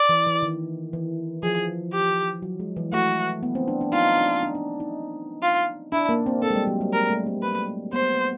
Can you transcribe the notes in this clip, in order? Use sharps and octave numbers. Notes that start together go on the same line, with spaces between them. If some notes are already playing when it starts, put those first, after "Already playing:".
Already playing: D5
E3
E3
D#3
E3
F3 G#4
G4
F#3
G#3
E3
A3 F#4
B3
C4
D4
D4
D#4 F4
D4
D4
D4
D#4
F4
D4 E4
A#3
C4
C4 A4
G#3
G3
F#3
G3
G#3 A#4
A3
C4
B4
B3 C5